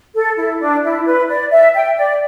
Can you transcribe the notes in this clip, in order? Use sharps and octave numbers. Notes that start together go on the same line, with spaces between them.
A4
E4
D4
E4
B4
D5
E5
G5
D5